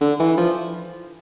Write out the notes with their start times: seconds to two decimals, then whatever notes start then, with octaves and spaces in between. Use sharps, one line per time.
0.01 D3
0.20 E3
0.37 F3